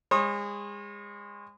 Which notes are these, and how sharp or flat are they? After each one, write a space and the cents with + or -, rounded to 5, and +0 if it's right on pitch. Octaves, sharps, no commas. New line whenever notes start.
G#3 -30 C#5 -45 D#6 +0